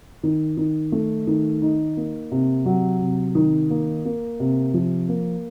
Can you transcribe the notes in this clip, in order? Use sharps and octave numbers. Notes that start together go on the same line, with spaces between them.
D#3
D#3
A3
D#3
D#4
A#3
C3
F#3
C3
D#3
A#3
A#3
C3
F3
A#3